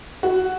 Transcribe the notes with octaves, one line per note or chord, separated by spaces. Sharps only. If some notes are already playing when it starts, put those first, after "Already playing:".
F#4